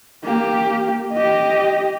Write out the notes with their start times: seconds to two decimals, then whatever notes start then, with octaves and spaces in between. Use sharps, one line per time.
0.24 A#3 G4
1.13 G4 D#5